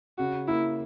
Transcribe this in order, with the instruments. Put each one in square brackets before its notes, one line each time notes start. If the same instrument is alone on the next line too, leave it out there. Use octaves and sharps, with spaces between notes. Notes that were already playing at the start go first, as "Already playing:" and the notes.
[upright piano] C#3 [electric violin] F#4
[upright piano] A#3 [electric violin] E4